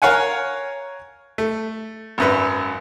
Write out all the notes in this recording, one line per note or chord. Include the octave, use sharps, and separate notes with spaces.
A#4 C#5 F5 F#5 G#5
A3
G#1 F#2 B4